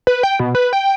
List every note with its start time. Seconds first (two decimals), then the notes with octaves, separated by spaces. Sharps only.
0.07 B4
0.23 G5
0.40 B2
0.55 B4
0.73 G5